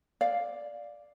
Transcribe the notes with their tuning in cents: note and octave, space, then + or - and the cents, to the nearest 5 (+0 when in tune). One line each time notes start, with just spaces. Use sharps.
D5 +0 F5 +0